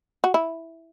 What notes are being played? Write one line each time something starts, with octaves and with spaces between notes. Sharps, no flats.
F#4
E4